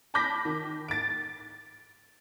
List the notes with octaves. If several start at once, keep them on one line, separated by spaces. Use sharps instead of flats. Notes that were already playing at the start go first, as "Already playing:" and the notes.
A5 B5 D6 G6 A#6 B6
D#3
A6 D7